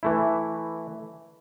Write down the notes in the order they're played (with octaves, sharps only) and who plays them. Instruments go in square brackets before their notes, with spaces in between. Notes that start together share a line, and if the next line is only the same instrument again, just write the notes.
[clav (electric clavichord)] E3 A3 E4